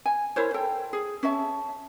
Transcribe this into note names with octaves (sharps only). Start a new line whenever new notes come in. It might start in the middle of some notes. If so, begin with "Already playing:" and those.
G#5
E4 A#4 C5 C#5
A4 G5
G#4
C#4 C#5 E5 A5